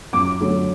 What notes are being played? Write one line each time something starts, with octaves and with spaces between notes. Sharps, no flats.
F#2 D6
D3 F#3 A3